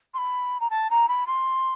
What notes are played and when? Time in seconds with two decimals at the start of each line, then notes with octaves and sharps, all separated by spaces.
0.14 C6
0.18 B5
0.60 A#5
0.70 A5
0.90 A#5
1.08 B5
1.27 C6